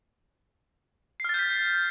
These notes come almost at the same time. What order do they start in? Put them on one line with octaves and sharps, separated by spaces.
C7 F6 A6 G6 B6